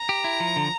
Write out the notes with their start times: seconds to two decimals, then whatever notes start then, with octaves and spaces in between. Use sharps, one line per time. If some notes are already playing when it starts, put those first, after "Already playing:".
Already playing: A#5
0.09 G4
0.24 E4
0.40 F3
0.56 D3